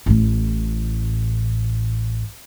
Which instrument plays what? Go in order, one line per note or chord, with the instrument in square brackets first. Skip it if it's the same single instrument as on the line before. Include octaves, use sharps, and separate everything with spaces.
[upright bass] A1 A2